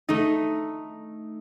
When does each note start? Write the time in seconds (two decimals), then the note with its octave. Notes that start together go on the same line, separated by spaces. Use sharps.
0.09 A3 D#4